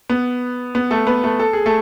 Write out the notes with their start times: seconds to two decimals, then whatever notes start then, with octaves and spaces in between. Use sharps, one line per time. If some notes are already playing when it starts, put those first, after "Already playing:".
0.10 B3
0.75 B3
0.91 A3 A4
1.07 B3 B4
1.24 A3 A4
1.39 A4
1.53 G#4
1.66 A3 A4